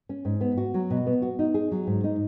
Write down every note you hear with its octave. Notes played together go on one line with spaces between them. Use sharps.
C#4
G#2
B3
F#4
F#3
B2
B3
F#4
D#4
G#4
F#3
G#2
D#4